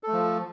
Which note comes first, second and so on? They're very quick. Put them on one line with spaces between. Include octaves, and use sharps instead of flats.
A4 A3 F3